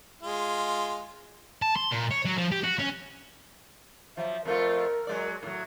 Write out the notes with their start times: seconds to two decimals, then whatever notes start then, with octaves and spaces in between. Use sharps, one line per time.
0.23 G#3 F4
1.62 A5
1.76 C6
1.91 A#2
2.11 C#5
2.25 F#3
2.37 F3
2.51 G4
2.63 F#4
2.79 C#4
4.17 F3 F#3 E5
4.45 F2 A3 F4 A#4
5.07 F#3 G#3 D5
5.43 A2 F#3